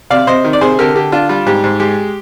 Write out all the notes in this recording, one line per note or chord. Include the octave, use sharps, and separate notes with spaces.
C3 D5 F5
C3 C5 D#5
D#3
D5
C3 G#4 C5
D3 G4 A#4
D3 G4
D4 F4
G3 F4
G#2 G4
G#2
G#3 G4